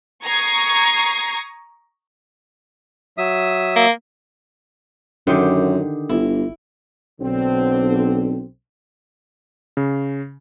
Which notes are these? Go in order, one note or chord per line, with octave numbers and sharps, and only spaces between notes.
A#5 C#6 D#6 G#6 C7
F#3 E5 D#6
A#3
F#2 D3 D#3 G4
G1 E4
B1 D3 C4
C#3